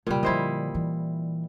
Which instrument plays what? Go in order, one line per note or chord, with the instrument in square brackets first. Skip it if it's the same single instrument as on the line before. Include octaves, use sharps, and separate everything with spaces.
[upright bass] F2 C#3 [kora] A#2 G3
[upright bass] D3 F3 [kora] E4 C5 D#5
[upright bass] E3